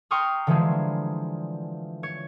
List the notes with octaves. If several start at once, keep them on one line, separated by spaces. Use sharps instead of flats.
G5 A#5 C6 C#6 D#6 F6
D3 E3 F3 G3 G#3
C#5